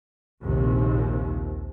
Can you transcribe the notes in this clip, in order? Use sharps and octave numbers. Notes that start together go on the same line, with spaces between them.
A#1 D#2 C3